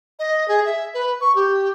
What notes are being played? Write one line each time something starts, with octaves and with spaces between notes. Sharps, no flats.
D#5
G#4
E5
B4
C#6
G4